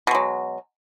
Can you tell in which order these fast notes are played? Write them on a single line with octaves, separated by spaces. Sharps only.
B2 G#3 F#3